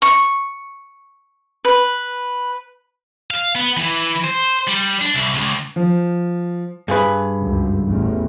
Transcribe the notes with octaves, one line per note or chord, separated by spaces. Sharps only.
C#6
B4
F5
B3
E3
C5
G3
D4
C2
C#2
F3
G2 G#4 B4
C#2 F#2
A1 E2